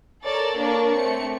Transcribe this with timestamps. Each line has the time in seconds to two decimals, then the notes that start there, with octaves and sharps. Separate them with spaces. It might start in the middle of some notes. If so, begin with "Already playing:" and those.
0.24 A4 A#4 C#5 D5 A6
0.58 A#3 D4 A#4 C#5 D5 C#6
0.93 A3 C4 C#7